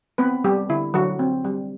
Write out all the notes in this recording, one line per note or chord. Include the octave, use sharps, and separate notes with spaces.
B3 C4 B4
G3 G4
D3 E4
D3 F#3 F#4
C4
G3